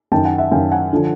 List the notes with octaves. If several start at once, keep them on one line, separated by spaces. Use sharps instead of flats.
F#2 D#3 G5 A5
F#5 G#5
E5 F#5
F#2 D#3 F5 G5
F#5 G#5
D3 F3